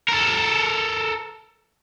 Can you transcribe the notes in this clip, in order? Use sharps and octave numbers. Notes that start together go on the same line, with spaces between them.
A4 A#4